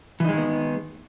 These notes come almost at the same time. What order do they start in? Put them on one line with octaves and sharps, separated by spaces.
E3 D#4 G#3 D#3 B3